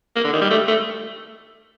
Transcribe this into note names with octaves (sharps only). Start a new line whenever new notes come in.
A#3
D3
D#3
G3
A3
A3